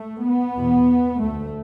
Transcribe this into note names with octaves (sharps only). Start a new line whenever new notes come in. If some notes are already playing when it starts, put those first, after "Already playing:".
Already playing: A3
B3
E2 B2
D2 A3